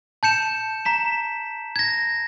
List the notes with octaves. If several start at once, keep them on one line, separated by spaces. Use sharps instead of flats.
A5 G6 C#7 E7
A#5 B6 E7
G#6 A#6